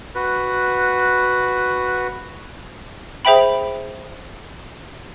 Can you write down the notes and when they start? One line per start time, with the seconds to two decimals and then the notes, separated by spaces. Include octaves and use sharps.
0.15 F#4 B4
3.25 G#4 C5 E5 G5 B5